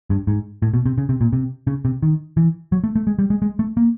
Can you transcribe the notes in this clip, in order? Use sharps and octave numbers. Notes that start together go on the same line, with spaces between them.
G2
G#2
A2
B2
C3
C#3
C3
A#2
C3
C#3
C3
D#3
E3
F#3
A3
A3
G#3
G3
G#3
G#3
A3
A#3